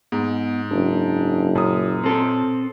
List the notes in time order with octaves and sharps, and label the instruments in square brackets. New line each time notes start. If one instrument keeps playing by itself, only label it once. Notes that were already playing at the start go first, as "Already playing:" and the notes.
[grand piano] G#2 [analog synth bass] B3
[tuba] F#1 [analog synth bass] D4
[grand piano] F#2 D#6 [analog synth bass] A#2
[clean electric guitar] C4 A4